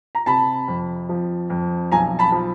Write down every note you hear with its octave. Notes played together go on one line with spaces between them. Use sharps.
A#5
C3 A5 B5
F2
F3
F2
B1 G#5 A#5
A5 B5
F3